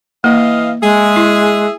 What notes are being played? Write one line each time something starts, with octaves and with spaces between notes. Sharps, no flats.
E3 A#3 D#5 F5
G#3 G#4 E5
E4